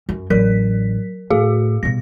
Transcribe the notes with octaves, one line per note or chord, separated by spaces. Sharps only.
F#2
A1 F#3 A#4 B6
A2 F#4 G#4 F5
G2 B2 A#6